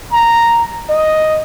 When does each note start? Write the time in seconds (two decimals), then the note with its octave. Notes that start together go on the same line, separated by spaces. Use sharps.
0.11 A#5
0.90 D#5